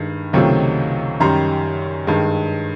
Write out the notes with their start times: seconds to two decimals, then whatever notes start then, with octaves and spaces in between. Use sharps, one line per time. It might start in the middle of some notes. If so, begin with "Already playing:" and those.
Already playing: G2 D#3 G#3
0.33 C#2 C3 D#3 F#3 A3
1.20 F#2 D#3 G3 A#5 C6
2.07 G2 D#3 G#3